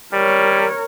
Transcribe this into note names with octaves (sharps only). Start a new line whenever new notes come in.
G3 A#4 C#5